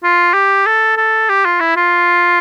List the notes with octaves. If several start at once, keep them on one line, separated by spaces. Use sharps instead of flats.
F4
G4
A4
A4
G4
F4
E4
F4